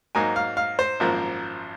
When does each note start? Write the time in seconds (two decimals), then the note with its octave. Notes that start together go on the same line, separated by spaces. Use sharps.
0.15 G#2 F#3 A#3 D#4 G#5
0.36 F5
0.57 F5
0.79 C5
1.00 G#1 F#2 F3 A#3